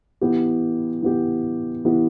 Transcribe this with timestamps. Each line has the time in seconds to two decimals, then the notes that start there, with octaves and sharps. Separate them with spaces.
0.21 E3 B3 G4
1.02 E3 B3 G4
1.85 E3 B3 G4